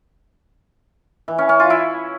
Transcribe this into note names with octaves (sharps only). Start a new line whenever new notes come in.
E3
C#4
C#4
F4
E4